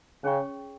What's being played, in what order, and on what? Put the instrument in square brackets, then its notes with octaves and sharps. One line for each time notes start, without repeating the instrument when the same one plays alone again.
[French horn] C#3 [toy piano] C#4 G#4 C#5 G5 C#6